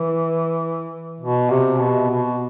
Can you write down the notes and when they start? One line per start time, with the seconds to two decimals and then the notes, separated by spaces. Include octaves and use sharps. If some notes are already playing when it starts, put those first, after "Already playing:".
Already playing: E3
1.20 B2
1.50 C3
1.80 B2
2.10 B2